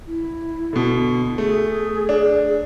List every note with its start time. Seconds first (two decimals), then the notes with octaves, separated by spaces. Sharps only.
0.07 E4
0.73 B2 D3
1.38 A3 G#4
2.09 D4